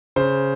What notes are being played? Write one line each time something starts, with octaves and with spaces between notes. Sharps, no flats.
C#3 C5